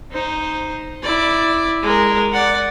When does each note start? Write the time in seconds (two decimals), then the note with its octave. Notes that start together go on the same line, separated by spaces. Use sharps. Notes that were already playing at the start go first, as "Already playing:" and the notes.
0.12 D#4 C5
1.02 E4 D5
1.83 G#3 A#4
2.32 D5 F#5